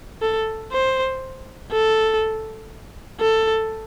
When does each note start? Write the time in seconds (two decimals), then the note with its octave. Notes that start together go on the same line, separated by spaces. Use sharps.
0.22 A4
0.72 C5
1.72 A4
3.20 A4